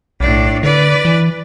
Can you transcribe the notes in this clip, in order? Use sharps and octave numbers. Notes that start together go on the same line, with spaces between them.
B1 A2 D4
D3 B4 D5
E3